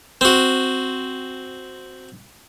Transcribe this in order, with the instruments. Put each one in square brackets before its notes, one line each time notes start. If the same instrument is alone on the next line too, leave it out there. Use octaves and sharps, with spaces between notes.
[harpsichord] C4 F#4